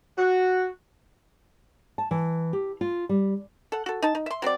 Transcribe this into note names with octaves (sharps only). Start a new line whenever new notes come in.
F#4
A5
E3
G4
F4
G3
A4 F#5
F#4 A4
D#4 A5
D#4
E5 C6
F#3 C4 B4 D5